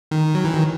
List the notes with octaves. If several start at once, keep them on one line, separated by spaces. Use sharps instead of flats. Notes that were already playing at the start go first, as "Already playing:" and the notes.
D#3
F#3
E3
D#3